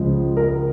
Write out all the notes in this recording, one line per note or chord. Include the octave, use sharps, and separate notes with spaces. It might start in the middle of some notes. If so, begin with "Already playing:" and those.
Already playing: C#2 C#3 F3 G#3
A#4